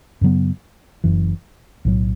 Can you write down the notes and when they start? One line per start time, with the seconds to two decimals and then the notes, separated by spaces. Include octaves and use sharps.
0.21 F#2 C#3 F#3 B3
1.04 F#1 F#2 E3
1.85 B1 A2 F#3